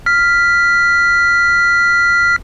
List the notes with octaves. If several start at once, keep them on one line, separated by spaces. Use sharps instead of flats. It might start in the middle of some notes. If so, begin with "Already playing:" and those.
F6 B6